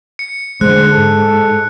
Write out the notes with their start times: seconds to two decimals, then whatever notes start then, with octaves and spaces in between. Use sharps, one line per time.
0.19 C#7
0.61 D3 G#3 C5 F#6
0.91 G#2 A4